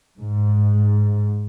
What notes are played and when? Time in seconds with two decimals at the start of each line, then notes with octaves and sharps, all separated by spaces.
0.20 G#2